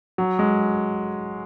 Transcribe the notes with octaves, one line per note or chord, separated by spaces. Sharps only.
F#3
G#3